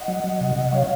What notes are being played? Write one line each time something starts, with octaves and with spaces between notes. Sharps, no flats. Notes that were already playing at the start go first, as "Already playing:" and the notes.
Already playing: D#5 F#5
F#3
F#3
C3
C3
F#3 C#5 F5